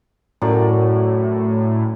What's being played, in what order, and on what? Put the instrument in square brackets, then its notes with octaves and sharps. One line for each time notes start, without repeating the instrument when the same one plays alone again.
[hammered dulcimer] F#2 D5 [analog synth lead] A2